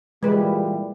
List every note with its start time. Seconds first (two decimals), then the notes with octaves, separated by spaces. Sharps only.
0.23 A#2 E3 G3 G#3 B4